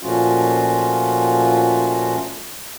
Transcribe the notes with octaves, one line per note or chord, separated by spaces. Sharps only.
A#2 F3 A3 C#4 F4 F#4